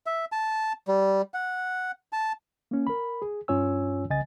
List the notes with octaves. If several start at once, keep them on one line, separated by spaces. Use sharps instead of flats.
E5
A5
G3
F#5
A5
A#3 C#4
A#4 B5
G#4
G2 C#4 F4 C#5 G#5 E6
C2 C#3 D#5 G#5 A6